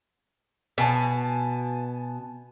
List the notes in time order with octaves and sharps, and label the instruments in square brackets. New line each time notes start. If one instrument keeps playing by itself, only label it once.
[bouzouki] B2 [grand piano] B3 G#5 A5